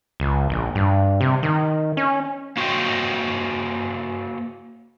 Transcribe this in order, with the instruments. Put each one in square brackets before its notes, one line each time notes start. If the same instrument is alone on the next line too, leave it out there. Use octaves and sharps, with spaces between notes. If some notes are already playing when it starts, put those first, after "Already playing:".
[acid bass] C#2
A#1
G2
C3
D#3
C#4
[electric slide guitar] A#3 F#4 C5 C#5 D#5 G5